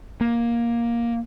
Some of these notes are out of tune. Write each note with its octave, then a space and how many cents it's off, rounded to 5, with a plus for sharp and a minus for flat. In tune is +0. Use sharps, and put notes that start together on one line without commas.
A#3 +10